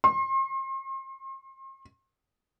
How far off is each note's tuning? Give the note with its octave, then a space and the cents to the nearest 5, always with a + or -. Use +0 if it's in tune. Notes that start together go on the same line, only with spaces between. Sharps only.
C6 +40